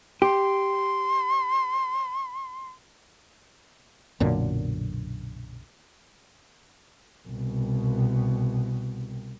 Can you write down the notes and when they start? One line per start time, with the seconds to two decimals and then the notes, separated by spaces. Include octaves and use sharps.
0.22 G4 C6
4.20 B1 F#2 A#2 D3
7.28 C2 B2